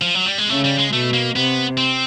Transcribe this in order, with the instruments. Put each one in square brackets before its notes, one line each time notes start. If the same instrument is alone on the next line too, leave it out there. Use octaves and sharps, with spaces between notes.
[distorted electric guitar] F3
F#3
G3
G#3
[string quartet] C#3 [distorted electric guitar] A3
[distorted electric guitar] G3
G#3
[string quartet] B2 [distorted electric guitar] A3
[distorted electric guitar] A#3
[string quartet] C3 [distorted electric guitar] B3
[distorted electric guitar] C4